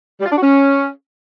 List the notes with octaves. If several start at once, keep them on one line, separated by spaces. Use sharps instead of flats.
G3
F4
D4
F#4
C#4